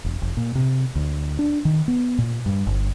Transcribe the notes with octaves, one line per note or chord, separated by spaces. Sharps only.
E1
F1
A#2
C3
D2
D4
D#3
B3
A#2
G2
G1